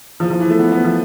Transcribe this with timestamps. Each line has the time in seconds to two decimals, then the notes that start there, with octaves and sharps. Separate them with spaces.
0.20 D#2 C#3 E3 F3
0.30 F3
0.40 E3
0.50 A3
0.59 B3
0.72 B3
0.84 F3